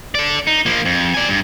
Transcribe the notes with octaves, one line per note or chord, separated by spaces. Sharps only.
A4 D5
D#4
F3 A#3
F2
D5 G#5
G2